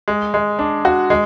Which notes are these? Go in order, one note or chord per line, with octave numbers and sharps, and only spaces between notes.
G#3
G#3
D4
F#4
G#3